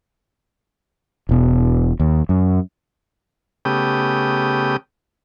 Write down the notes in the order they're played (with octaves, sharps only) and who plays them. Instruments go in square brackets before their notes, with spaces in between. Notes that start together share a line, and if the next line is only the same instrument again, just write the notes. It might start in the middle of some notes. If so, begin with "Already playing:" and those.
[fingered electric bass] E1 B2
D#2
F#2
[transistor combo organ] C#3 A3 B3 G4 G5 D#6